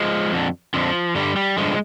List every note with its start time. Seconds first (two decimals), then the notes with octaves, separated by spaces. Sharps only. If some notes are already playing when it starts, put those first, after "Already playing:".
Already playing: F3 G#3
0.32 F2 D3
0.74 F2 D3 F3
1.15 G2 D3 G3
1.36 G3
1.58 G2 D3 F3 G#3